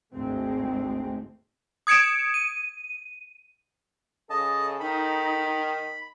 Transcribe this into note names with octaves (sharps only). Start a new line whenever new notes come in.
G#1 D2 G#3 A3 C4
D#6 G#6 C#7 D7 E7
D#7
C#3 A4 D#5 A5
D#3 D#4 B5